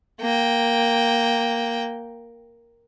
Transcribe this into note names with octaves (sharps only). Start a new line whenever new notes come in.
A#3 G5